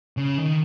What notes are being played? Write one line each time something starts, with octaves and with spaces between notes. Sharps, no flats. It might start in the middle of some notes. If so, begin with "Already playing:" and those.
C#3
D#3